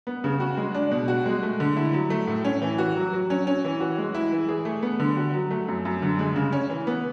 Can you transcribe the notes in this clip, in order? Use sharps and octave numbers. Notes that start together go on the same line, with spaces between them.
B3
C#3
F#4
G#3
D4
B2
F#4
G#3
A3
D3
E4
F#3
A3
A2
C#4
E3
F#4
F#3
F#3
C#4
C#4
E3
F#4
G#3
E4
E3
G#4
A3
B3
D3
F#4
F#3
A3
F#2
F#2
D3
G#3
C#3
C#4
E3
B3